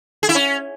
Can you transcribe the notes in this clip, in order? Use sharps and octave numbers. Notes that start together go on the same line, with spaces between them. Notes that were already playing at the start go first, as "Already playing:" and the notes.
G#4
E4
C#4